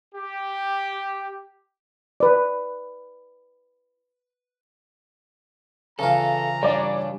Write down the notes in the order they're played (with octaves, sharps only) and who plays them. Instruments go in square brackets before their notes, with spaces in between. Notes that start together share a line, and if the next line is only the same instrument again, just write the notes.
[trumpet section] G4
[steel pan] B4 D5
[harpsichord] C#3 E3 F4 [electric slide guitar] A4 [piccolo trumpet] A#5
[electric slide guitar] G3 D4 [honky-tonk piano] C#5 D5